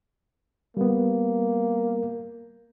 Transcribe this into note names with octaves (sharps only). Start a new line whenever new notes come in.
G3 A#3 B3